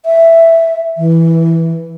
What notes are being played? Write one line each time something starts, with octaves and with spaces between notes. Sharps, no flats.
E5
E3